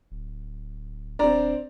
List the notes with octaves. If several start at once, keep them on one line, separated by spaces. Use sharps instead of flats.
D1
D#1 C4 D4 D5 A#5